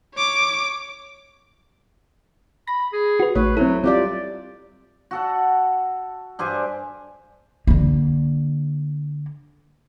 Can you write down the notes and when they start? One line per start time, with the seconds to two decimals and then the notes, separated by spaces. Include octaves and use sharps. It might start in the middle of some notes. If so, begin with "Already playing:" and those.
0.14 C#5 D6
2.68 B5 A#6
2.92 G#4
3.20 F#4 B4
3.35 A1 A3 B4 C#5
3.57 F#3 C4 E4 A4
3.84 G3 C4 F4 G4 D5
5.11 F#4 A4 F#5
6.39 G2 G4 C5 G#5
7.67 D3 A#3